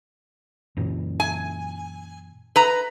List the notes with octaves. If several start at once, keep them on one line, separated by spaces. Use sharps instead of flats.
F#2 A#2 E3
G#5
B4 A#5